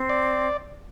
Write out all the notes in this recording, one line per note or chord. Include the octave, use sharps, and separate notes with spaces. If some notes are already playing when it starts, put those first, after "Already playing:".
Already playing: C4
D5